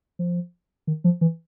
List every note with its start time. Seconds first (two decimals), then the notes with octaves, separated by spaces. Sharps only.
0.19 F3
0.87 D#3
1.04 F3
1.21 E3